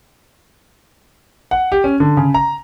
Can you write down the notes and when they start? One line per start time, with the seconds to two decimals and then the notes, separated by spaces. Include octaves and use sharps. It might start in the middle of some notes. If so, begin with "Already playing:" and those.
1.51 F#5
1.72 G4
1.84 C#4
2.00 D3
2.17 C#3
2.34 A#5